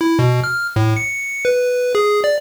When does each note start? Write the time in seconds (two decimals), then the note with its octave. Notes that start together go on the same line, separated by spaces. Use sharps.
0.01 E4
0.19 B2
0.44 F6
0.76 A2
0.97 C#7
1.45 B4
1.95 G#4
2.24 D5